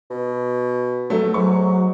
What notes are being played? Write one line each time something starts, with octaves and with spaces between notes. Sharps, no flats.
B2
F#3 A3
G#2 F#3 C#6